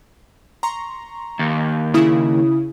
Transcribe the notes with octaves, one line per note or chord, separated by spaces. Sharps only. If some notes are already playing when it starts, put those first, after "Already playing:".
A#5 C6 C#6
D#2
C#3 E4 D#6